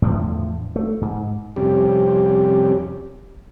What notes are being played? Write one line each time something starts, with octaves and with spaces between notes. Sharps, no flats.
E2 A2 D3 F3
A3
G#2
F2 C3 G3 C#4 G4